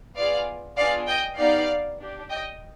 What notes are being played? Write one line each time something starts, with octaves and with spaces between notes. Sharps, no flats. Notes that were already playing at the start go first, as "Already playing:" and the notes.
B3 F4 G#4 D5 F5
B3 D4 F4 G#4 D5 F5
D#5 G5
B3 D#4 G4 D5 F5
D4 G4
D#5 G5